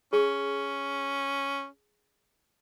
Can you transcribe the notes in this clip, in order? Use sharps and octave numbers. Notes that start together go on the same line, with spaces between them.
C#4 G#4